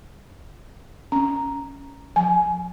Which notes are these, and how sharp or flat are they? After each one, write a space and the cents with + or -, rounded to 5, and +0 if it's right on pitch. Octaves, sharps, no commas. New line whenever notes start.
C#4 +0 A#5 +0
F3 +40 G#5 +20